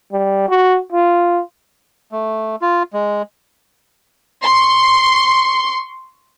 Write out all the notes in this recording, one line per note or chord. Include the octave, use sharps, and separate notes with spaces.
G3
F#4
F4
A3
F4
G#3
C6 C#6